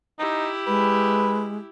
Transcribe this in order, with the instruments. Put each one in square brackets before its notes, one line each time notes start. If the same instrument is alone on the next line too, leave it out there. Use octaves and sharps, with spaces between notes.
[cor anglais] D#4 [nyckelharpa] E4 G4
[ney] G#3 [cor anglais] B4